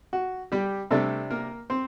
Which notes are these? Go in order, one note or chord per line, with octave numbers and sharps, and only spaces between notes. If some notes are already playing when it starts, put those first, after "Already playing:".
F#4
G3 G4
C3 G3 A3 D4 A4
A#3 A#4
C4 C5